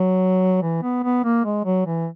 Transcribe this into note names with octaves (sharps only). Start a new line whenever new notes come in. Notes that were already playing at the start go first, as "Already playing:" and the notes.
Already playing: F#3
E3
B3
B3
A#3
G#3
F#3
E3